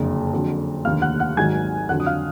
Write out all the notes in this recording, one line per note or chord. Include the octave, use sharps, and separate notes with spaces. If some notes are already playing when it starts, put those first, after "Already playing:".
Already playing: F#1 F2 D3 F#3
F2 D3 F#3
F1 D#2 D3 F5 F6
F#5 F#6
F#5 F#6
G#1 G#2 D#3 F#3 G#5 G#6
F2 D3 F#3 F#5 F#6
D#6
F5 F6